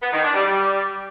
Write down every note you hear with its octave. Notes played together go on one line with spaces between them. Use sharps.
B3
D#3
D4
G3
G3